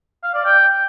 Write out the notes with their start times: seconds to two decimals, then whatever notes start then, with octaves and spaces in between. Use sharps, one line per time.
0.23 F5
0.34 D5
0.45 G5